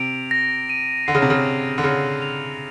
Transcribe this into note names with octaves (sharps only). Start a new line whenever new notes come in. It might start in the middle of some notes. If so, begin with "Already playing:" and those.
Already playing: C3 D7 F7
A#6
D#7
D3 C7
C#3
C3
C#3
F7
D3
C#3 C#7
F7